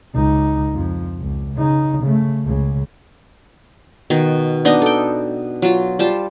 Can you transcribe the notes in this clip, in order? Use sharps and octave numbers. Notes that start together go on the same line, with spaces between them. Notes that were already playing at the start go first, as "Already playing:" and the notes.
C#2 D#4
F2 F3
C#2
C#3 D#4
C#3 A3
C#2 C#3
B2 D#3
B3 D4 D#4 D#5
A4 G5
F#3 F4
G3 F4 C5 A5